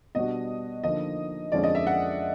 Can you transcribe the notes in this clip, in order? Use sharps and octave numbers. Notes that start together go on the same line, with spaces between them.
B2 G3 B3 D4 F#4 D#5
D3 F3 A#3 D#4 D#5
F2 D3 F3 G#3 C#4 D5
D#5
E5
F#5